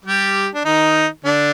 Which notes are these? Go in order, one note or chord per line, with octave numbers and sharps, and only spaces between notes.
G3 G4
D4
D#3 D#4
D3 D4